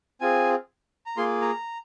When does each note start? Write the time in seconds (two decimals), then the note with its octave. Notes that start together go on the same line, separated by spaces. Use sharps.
0.21 C4 F4 G#4 G#5
1.06 A#5
1.17 A#3 F4 G#4 C6
1.42 A#5